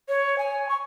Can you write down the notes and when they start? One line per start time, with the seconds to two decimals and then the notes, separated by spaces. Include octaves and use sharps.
0.09 C#5
0.38 G#5
0.69 C#6